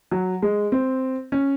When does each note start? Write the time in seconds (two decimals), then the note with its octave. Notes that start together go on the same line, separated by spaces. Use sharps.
0.11 F#3
0.42 G#3
0.72 C4
1.32 C#4